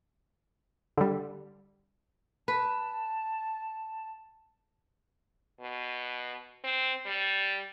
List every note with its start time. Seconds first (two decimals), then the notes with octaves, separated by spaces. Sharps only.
0.97 D3 G3
2.48 B4 A5
5.61 B2
6.64 C4
7.06 G3